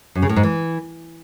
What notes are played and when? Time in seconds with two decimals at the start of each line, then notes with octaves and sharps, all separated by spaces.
0.15 F#2
0.22 C#3
0.29 A2
0.36 G#2
0.43 E3